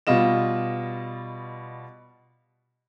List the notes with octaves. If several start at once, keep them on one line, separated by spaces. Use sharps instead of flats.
B2 G3 F4 D#5 E7